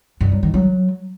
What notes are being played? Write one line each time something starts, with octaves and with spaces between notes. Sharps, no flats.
G2
F#3
D#3
F#3